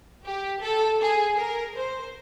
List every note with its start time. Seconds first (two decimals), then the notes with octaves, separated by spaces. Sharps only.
0.24 G4
0.62 A4
1.00 G#4
1.38 A#4
1.75 C5